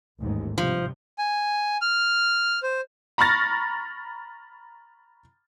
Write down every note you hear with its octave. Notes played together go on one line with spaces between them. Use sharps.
A1 D#2 G#2
G2 C3 F3
G#5
F6
C5
A#5 B5 C#6 F6 A6 A#6